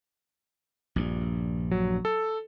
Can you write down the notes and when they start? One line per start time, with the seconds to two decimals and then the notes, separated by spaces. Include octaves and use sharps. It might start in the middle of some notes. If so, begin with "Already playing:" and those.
0.96 A#1 G2
1.71 F#3
2.05 A4